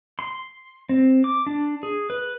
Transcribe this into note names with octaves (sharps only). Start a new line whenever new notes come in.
C6
C4
D6
D4
G#4
B4